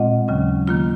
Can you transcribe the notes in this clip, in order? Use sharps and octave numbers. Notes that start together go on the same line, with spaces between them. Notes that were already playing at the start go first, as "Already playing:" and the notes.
Already playing: A#2 G#3 C4 F4 D#5 F#5
D#2 C#3 F#3 C#4
D#3 A#3 F4